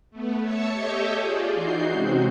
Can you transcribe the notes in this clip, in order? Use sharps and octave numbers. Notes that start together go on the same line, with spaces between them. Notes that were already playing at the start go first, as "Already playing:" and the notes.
A3 B3
C#5 E5 A5 C#7
G4 A4 C#5 D#5 E5 G5
F4 G#4 D5
E3 D#4 F#4 G6 C7
C3 G#3 C4 C#4 F#4